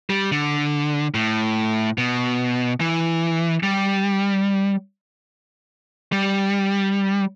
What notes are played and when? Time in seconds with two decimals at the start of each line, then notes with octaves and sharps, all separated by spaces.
0.10 G3
0.32 D3
1.14 A2
1.98 B2
2.80 E3
3.63 G3
6.12 G3